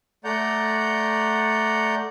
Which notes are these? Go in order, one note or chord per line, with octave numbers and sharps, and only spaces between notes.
A3 D5 F#5 A#5 G6